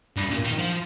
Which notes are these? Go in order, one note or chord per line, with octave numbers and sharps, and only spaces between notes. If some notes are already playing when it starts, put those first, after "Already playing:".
G2
A#2
D#3
F3